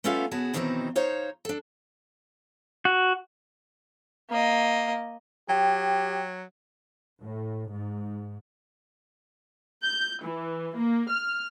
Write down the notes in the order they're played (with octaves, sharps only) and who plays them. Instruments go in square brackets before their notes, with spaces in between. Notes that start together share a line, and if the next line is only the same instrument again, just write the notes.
[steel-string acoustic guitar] A3 B3 C#4 F4 A4 F5
C#3 B3 F#4 G#4 A5
B2 D#3 E3 F#3 C4 D#4
D#4 C5 C#5 F5
D4 A4
[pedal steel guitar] F#4
[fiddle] A#3 D#5
[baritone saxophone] F#3 [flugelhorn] G4 [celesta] G5
[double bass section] A2
G#2
[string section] G6
E3
A#3
F6